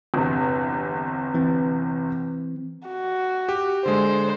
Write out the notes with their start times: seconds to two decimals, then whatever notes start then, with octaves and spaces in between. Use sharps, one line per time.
0.14 G1 E2 C3
1.34 E3 C4
2.88 F#4
3.49 G4
3.86 D3 G#3 C5